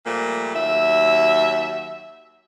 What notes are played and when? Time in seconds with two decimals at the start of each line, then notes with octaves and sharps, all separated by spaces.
0.06 A#2 F3 G3 A3 A#3
0.55 D#2 F#3 E5